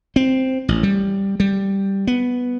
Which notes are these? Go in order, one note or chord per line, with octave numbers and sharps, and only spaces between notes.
C4
A1
G3
G3
B3